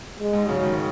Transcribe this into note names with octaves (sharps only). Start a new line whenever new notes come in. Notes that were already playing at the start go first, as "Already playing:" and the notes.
G#3
G#2
C#3 F#3
D#3